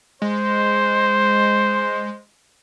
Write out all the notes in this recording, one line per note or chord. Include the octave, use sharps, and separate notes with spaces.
G#3 C5